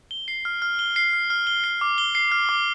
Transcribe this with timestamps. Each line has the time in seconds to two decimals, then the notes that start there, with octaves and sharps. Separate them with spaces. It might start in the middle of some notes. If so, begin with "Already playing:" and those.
0.11 G7
0.28 C7
0.45 F6
0.62 F6
0.79 G7
0.96 C7
1.13 F6
1.30 F6
1.47 G7
1.64 C7
1.81 D6
1.98 G7
2.15 C7
2.32 F6
2.49 D6